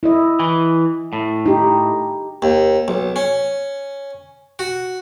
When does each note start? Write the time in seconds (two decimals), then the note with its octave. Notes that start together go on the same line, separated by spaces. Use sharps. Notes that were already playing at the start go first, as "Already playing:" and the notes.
0.03 E4 D#5
0.39 E3
1.13 A2
1.46 D#4 G4
2.42 D#2
2.88 B1
3.16 C#4
4.59 F#4